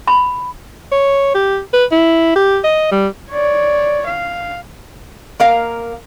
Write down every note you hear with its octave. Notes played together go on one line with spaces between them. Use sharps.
B5
C#5
G4
B4
E4
G4
D#5
G3
C#5 D5
F5
A#3 A#4 F5